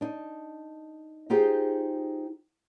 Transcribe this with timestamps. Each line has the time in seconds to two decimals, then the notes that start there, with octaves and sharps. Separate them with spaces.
0.01 D4 D#4
1.30 D#4 F4 G4 G#4 C5